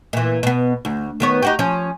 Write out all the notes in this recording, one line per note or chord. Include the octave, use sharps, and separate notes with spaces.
A#2 E3
B2 B3
D2
D#3 B3 C#5
D#4 F#4 G4
F3 C#4